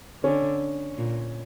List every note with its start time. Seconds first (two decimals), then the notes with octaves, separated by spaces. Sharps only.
0.24 D3 C#4
0.98 A#2